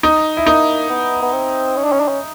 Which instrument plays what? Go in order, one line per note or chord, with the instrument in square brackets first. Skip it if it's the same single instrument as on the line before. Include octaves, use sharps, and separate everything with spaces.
[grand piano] D#4
E4
[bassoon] A#3 [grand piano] D#4
[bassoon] B3
B3
C4
C#4
D4
C#4
D4
C#4